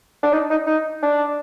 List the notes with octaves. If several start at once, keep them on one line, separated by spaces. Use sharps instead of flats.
D4
D#4
D#4
D#4
D4